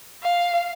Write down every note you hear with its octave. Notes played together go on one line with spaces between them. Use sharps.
F5